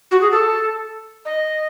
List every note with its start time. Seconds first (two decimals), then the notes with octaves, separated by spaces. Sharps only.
0.11 F#4
0.21 G#4
0.31 A4
1.25 D#5